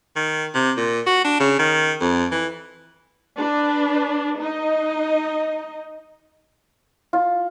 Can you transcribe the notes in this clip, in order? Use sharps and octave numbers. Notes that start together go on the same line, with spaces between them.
D#3
C3
A#2
F#4
D4
C#3
D#3
F2
E3
D4 B4
D#4 D#5
F4